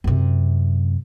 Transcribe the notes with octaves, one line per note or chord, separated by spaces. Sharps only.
F#2 C3